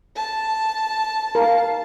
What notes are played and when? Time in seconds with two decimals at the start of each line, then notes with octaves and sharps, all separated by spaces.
0.17 A5
1.35 A#4 F5